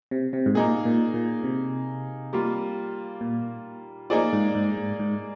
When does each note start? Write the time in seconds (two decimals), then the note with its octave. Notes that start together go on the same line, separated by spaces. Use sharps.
0.11 C3
0.33 C3
0.46 G#2
0.55 A#2 A#3 D#4 G#4
0.85 A#2
1.14 A#2
1.43 C3
2.33 G3 A#3 F4
3.21 A#2
4.10 F3 A#3 D#4 G#4 D5
4.33 G#2
4.55 G#2
4.77 G#2
4.99 G#2